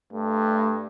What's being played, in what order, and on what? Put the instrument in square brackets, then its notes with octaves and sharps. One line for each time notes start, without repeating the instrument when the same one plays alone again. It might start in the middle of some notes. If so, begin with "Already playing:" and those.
[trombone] G2 [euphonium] A3